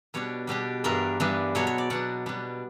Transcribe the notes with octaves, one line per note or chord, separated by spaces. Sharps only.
B2 G3 B3 D4 C#5
B2 G3 B3 D4 G4
G2 E3 G3 B3 D4 A#4
G2 E3 G3 B3 D4
B2 F#3 B3 D4 C#5
C#5
D5
B2 F#3 B3 D4 F#5
B2 G3 B3 D4